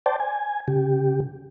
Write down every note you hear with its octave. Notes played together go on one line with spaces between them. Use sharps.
C5 D5 G5 A5
G#5
C#3 G4